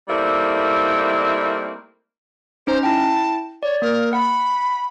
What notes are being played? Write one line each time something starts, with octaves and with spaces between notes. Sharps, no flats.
G3 A3 A#3 C4 D#4 E4
C#4 D#4 C5 A#5
E4 G5 A5
C#5 D5
A#3 A#4
F#5 B5